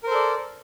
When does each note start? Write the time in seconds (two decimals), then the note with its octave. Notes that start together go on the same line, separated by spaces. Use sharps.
0.03 A#4
0.07 C5
0.11 A4
0.14 D5